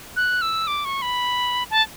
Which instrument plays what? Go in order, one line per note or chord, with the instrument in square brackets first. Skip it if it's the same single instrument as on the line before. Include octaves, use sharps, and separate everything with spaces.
[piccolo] F#6
E6
D6
C#6
B5
A5